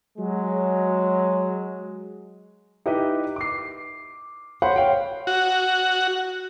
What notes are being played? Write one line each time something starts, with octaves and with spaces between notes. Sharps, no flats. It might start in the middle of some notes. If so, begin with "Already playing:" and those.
F#3 G#3
D#4 E4 G4 B4 D#5
D6 C7
C5 C#5 F#5 B5 C6
C#5 F5 G5
F#4